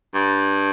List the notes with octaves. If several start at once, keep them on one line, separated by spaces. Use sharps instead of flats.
G2